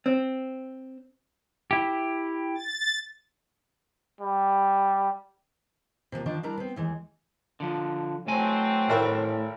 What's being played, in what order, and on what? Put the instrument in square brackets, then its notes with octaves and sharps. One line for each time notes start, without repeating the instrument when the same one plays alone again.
[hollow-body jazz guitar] C4
[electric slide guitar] E4 G4
[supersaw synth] A6
[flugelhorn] G3
[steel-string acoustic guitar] C3 F3 A3 A#3
D3 D#3 F3 D4
G3 D4 E4 A#4 D5 A#5
B3 C4
D#2 E3 G#3
[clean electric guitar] D3 F3
[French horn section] E3 F#3 C4 [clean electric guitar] A3 G#5
[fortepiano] G#1 E4 A#4 [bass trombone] A2